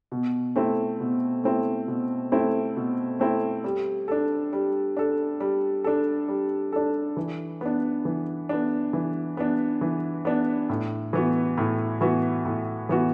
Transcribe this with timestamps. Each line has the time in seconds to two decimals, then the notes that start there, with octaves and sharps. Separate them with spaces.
0.12 B2
0.56 A3 C4 E4
1.00 B2
1.44 A3 C4 E4
1.88 B2
2.32 A3 C4 E4
2.77 B2
3.20 A3 C4 E4
3.64 G3
4.08 D4 A4
4.53 G3
4.97 D4 A4
5.40 G3
5.84 D4 A4
6.28 G3
6.72 D4 A4
7.17 E3
7.61 B3 D4
8.05 E3
8.49 B3 D4
8.93 E3
9.37 B3 D4
9.81 E3
10.25 B3 D4
10.69 A2
11.13 E3 B3 F#4
11.57 A2
12.01 E3 B3 F#4
12.45 A2
12.89 E3 B3 F#4